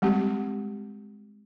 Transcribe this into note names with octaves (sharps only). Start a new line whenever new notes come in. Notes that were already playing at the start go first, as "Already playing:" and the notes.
G3 G#3 C4 G4